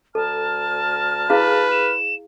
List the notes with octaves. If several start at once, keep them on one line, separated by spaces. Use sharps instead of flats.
D2 A4 A5 A#5 F6
E4 G#4 B4 F5
E7